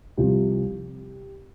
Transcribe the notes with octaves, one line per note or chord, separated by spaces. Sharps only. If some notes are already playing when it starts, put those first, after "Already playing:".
C2 C3 F3 G4